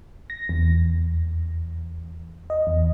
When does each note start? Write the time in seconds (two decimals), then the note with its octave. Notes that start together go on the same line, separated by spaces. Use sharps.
0.30 A#6
0.49 E2
2.50 D#5
2.67 E2